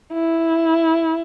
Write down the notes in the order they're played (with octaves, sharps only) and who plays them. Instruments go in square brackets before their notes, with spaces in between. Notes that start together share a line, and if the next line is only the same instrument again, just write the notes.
[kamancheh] E4